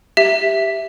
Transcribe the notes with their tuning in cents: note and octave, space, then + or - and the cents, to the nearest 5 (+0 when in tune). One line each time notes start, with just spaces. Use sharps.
G4 +0 E5 +0